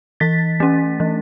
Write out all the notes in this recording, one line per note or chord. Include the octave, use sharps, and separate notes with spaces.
E3 A6 B6
A3 C#4
E3